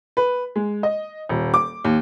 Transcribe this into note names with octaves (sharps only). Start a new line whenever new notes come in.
B4
G#3
D#5
D#1
D6
D#2